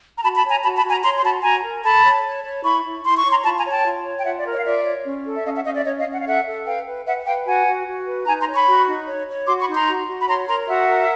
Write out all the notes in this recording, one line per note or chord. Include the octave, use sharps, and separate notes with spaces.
A#5
F#4 A5 B5
A5 B5
C#5
G#5 A#5
F#4 A5 B5
A5 B5
F#4
G#5 A#5
C#5 A#5 C6
C6
F#4 A5 B5
F#4 G#5 A#5
A#4
A4 A5 B5
C#5
C#5
C#5
E4 B5 C#6
E4
E4 C6
C#6
C#5
A#5 C6
F4 A5 B5
G#5 A#5
C#5
G5 A5
F4
C#5
G5
F4 E5 F#5
D5
A#4
C#5 D#5
F5
F4 D5 E5
C#5
C#4
A4
E5
C#4 D#5 F5
E5 F#5
C#4 D#5 F5
D5 E5
C#4 C#5 D#5
D#5 F5
C#4
F#5
F5
A4 E5 F#5
A4
B4 F5 G5
B4
B4 E5 F#5
B4 F5 G5
F#4 F#5 G#5
F#4
F#4
B4
D#4 G#5 A#5
A#5 C6
C#5
B5 C#6
F#4
D#4
C#5
C#5
F#4 C6 D6
B5 C#6
D#4
A#5 C6
F#4
F#4
B5
C#5 A#5 C6
A#4 A#5 C6
F#4 E5 F#5
A#4